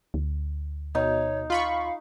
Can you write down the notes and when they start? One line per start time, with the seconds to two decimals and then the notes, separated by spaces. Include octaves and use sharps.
0.14 D2
0.95 B2 D#4 C#5
1.50 F4 F5 B5 C#6